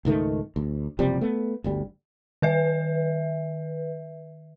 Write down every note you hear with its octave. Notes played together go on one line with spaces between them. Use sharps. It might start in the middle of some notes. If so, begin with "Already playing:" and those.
C#2 G#2 D#3 A3
D2
F#1 C3 F3 G3
A3 B3
G1 D2 G3
D#3 B4 E5